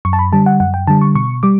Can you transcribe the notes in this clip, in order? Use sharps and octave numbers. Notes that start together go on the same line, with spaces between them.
F#2 C#6
A5
B5
D3 G3 A5
F#5
F#2 F#5
G5
D3 G3 A5
C#6
B2 C#6
G3 D6